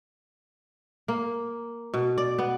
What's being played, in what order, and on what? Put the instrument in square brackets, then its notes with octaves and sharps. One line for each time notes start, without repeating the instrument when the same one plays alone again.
[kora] A#3
B2
D5
B3